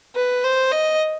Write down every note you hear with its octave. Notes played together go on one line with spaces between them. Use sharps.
B4
C5
D#5